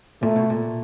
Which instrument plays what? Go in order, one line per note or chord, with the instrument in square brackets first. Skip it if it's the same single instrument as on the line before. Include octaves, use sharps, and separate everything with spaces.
[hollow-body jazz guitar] A#2 [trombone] A3
[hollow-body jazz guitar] B2
A#2